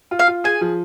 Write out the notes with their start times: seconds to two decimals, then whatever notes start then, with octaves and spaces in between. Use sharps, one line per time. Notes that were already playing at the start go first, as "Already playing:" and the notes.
0.11 F4
0.19 F5
0.28 F4
0.44 G#4 G#5
0.61 F3